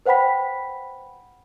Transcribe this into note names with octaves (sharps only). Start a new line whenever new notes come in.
B4 C5 F#5 G5 B5 B6